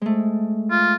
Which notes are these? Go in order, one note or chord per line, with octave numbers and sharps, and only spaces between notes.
G#3 A3
F4